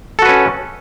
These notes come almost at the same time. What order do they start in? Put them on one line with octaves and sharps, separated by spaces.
A4 F#4 B4 C#4